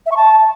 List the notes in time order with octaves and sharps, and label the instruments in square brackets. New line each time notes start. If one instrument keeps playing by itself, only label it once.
[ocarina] E5
C#6
A5